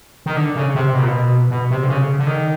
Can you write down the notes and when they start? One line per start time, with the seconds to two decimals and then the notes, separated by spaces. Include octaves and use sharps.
0.26 D#3
0.37 D3
0.56 C#3
0.75 C3
0.94 B2
1.01 A#2
1.08 B2
1.51 B2
1.71 C3
1.83 D3
1.88 C#3
2.19 D3
2.27 D#3